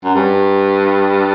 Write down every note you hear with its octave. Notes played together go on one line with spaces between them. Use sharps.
F#2
G2